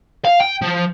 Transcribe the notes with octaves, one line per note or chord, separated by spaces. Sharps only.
F5
G5
F3